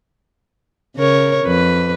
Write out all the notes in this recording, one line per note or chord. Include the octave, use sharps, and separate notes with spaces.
C#3 A#4 C#5
F2 B4